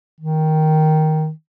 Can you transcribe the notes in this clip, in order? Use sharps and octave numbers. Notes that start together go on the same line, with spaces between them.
D#3